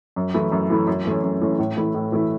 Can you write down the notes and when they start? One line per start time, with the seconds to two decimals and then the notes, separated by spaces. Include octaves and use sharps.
0.16 F#2
0.34 E3 A3 E4
0.52 F#2
0.70 E3 A3 E4
0.87 F#2
1.05 E3 A3 C#4
1.23 F#2
1.41 E3 A3 C#4
1.59 A2
1.77 E3 A3 E4
1.94 A2
2.12 E3 A3 E4